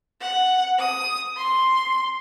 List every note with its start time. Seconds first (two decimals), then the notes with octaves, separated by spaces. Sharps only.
0.21 F#5
0.79 D#6
1.37 C6